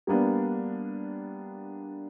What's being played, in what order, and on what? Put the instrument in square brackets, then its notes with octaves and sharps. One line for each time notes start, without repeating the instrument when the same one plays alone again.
[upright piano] G3 A#3 B3 D4